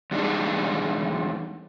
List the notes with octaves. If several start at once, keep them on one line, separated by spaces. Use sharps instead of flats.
E2 G3 G#3 D4 D#4